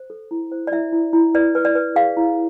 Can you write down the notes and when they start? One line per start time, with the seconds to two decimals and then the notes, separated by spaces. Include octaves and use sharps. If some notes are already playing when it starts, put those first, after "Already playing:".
Already playing: C5
0.10 A4
0.31 E4
0.52 C5
0.67 D5
0.72 E4 E5
0.93 E4
1.13 E4
1.34 B4 D5
1.55 B4
1.65 D5
1.75 B4
1.96 G#4 F5
2.17 E4